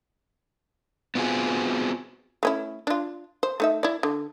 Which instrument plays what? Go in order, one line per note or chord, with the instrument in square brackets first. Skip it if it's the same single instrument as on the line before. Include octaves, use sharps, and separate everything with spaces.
[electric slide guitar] B3 C4 F4 F#4 G#4
[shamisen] A3 C#4 E4
D4 F4
C5
A3 D#4 E5
E4 D5
D3